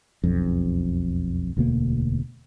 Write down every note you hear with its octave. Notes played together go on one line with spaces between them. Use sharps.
E1 B1 F2
E1 D2 B2 A#3